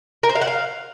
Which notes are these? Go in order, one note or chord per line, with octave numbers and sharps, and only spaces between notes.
A#4
C5
F5
F#5
F5